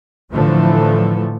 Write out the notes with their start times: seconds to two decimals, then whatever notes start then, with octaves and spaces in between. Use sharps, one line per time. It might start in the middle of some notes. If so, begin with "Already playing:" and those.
0.31 A2 D3 E3 F3 A3